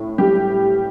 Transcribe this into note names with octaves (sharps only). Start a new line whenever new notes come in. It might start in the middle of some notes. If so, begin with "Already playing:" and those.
Already playing: A2
G3 G4